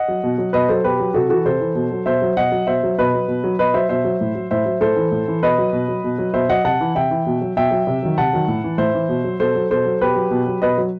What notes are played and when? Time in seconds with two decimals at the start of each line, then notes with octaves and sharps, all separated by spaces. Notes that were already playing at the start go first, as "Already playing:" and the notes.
Already playing: D#5 F#5
0.08 F#3
0.24 B2
0.38 F#3
0.53 B2 B4 D#5
0.69 F#3 A4 C5
0.84 B2 G4 B4
0.99 F#3
1.14 C3 F#4 A4
1.29 E3 F#4 A4
1.45 C3 A4 C5
1.61 E3
1.75 B2
1.91 F#3
2.06 B2 C5 E5
2.22 F#3
2.37 B2 D#5 F#5
2.52 F#3
2.67 B2 C5 E5
2.83 F#3
2.98 B2 B4 D#5
3.14 F#3
3.28 B2
3.44 F#3
3.59 B2 B4 D#5
3.74 F#3 C5 E5
3.89 B2 C5 E5
4.04 F#3
4.21 A2
4.35 F#3
4.51 A2 C5 E5
4.66 F#3
4.81 A2 A4 C5
4.96 E3
5.12 A2
5.28 E3
5.43 B2 B4 D#5
5.58 F#3
5.73 B2
5.88 F#3
6.04 B2
6.18 F#3
6.34 B2 C5 E5
6.49 F#3 D#5 F#5
6.65 C3 F#5 A5
6.81 E3
6.95 C3 E5 G5
7.11 E3
7.26 B2
7.41 F#3
7.57 B2 E5 G5
7.71 F#3
7.87 C3
8.03 D#3 F#3
8.18 C3 F#5 A5
8.33 D#3 F#3
8.48 A2
8.64 E3
8.78 A2 C5 E5
8.95 E3
9.09 B2
9.24 F#3
9.40 B2 A4 C5
9.55 F#3
9.70 B2 A4 C5
9.85 F#3
10.01 B2 G4 B4
10.16 F#3
10.31 B2
10.47 F#3
10.62 B2 B4 D#5
10.78 F#3